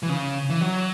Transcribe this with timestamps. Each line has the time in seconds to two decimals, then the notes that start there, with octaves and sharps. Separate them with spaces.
0.03 E3
0.09 C#3
0.50 E3
0.61 F#3